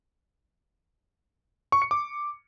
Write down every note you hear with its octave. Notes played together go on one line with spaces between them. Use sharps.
C#6
C#7
D6